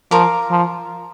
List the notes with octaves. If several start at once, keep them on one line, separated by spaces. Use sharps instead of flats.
F3 A#4 F5 D6
F3